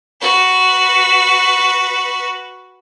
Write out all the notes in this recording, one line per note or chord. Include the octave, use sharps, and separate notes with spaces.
F#4 B4